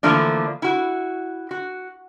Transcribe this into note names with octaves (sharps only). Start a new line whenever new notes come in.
D3 E3 F3 A3 A#3 D4
E4 F#4
F#4